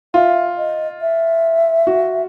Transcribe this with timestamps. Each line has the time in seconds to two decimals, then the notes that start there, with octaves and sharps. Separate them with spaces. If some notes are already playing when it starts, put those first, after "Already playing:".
0.14 F4 E5
0.58 D#5
1.01 E5
1.87 F#4